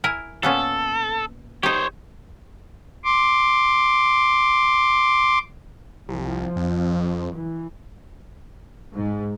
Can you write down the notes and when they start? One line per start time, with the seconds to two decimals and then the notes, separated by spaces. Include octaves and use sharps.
0.04 E4 A#4 G#5
0.43 A#2 B3 C#4 A4
1.63 D#4 G4 C5 C#5
3.05 C6 D6
6.09 C2 F3
6.56 F2
7.34 E3
8.93 G#2